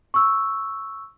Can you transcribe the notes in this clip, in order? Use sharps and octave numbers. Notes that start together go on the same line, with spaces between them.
C#6 E6